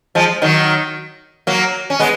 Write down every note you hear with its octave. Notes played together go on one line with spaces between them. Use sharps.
F3 G#3
D#3 F#3
F#3 A#3
C#4
G#3 B3